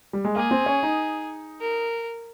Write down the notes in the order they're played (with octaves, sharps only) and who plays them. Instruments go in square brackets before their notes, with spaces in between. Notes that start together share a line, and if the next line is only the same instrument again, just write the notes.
[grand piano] G3
G#3
[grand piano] A#3 [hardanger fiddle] G#4
[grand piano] C4
C#4
D#4
[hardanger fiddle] A#4